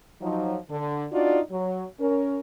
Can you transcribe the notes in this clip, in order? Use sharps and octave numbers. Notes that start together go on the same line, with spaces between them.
F3 F#3 D#4
D3
D4 D#4 F4 F#4 D5
F#3
C#4 A#4